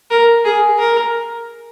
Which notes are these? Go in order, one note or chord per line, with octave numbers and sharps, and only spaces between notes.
A#4
G#4
A#4